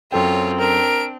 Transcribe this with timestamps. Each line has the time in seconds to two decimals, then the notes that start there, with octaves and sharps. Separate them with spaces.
0.12 F#2 C4 F4 A4 C#5 G5
0.60 D4 A#4 D7